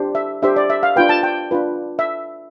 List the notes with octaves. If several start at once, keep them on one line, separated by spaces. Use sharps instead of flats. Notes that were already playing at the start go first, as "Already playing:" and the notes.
Already playing: D4 G4 C5
E5
D4 G4 C5 E5
D5
E5
F5
D4 F4 B4 G5
A5
G5
D4 F4 B4
E5